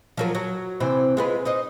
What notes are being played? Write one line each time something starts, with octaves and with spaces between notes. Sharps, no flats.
F3 F#3 A#4
F#3
C3 E3 C4
G#3 F4 B4
D#4 C5 D#5